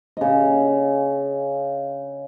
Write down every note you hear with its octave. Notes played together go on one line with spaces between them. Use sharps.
C#3 D#5